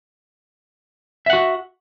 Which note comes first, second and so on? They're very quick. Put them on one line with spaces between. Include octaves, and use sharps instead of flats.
E5 F#5 F#4